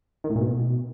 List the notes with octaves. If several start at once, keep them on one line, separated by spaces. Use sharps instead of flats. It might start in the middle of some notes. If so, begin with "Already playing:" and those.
D#3
A2
A#2
B2